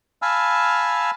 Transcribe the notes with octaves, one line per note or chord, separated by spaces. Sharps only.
F5 G#5 A5 B5 E6 F6